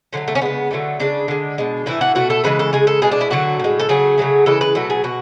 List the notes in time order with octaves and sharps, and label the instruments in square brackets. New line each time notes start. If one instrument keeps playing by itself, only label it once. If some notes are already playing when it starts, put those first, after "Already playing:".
[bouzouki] D3 F#3 A3 C#4
A3
C#4
C#3 G#3 B3
D3 F#3 A3
C#3 E3 G#3 D4
D3 G#3
B2 G#3
A2 E3 A3 E4
F#4
B2 A3 F#4
A4
C#3 E3 G#3 B4
A4
C#3 G#3 G#4
A4
B2 G#3 G#4
D4
E4
D3 F#3 A3 F#4
A2 G#3
A4
C#3 F#3 A3 G#4
C#3 F#3 A3
C#3 E3 G#3 A4
B4
B2 F#3 A3 A4
G#4
B2 F#4